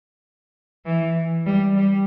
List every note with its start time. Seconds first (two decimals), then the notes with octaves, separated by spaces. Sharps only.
0.86 E3
1.47 G3
1.77 G3